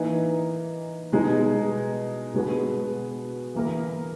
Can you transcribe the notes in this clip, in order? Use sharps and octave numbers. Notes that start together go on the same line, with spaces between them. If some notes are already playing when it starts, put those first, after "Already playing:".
Already playing: E3 A#3 D#4
B2 G#3 D#4
B2 G#3 B3 F#4
E3 A#3 E4 A#4